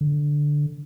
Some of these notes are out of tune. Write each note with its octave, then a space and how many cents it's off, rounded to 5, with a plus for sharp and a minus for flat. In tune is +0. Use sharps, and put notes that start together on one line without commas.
D3 +0